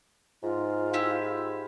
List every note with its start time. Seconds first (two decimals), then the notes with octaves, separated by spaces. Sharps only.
0.43 G#2 F4
0.93 E4 G4